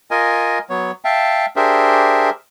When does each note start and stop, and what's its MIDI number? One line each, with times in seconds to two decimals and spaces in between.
0.11 0.59 65
0.11 0.59 70
0.11 0.59 75
0.11 0.59 80
0.70 0.91 54
0.70 0.91 59
0.70 0.91 73
1.05 1.46 76
1.05 1.46 77
1.05 1.46 79
1.05 1.46 81
1.56 2.30 62
1.56 2.30 67
1.56 2.30 68
1.56 2.30 70
1.56 2.30 72
1.56 2.30 76